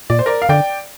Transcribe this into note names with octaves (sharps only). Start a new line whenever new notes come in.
A#2 D5
C5
A#4 D5
F5
D3 D5 G5